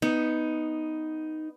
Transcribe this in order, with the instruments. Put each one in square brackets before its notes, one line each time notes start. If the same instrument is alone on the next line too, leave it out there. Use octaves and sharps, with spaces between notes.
[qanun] B3 [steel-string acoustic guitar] D#4